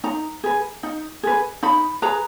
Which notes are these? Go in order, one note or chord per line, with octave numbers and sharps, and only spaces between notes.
D#4 A#5
G#4 B4
D#4
G#4 B4
D#4 B5
G#4 B4 A#5